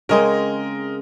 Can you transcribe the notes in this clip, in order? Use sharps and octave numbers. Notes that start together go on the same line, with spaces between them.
C#3 G#3 C4 A#4 D#5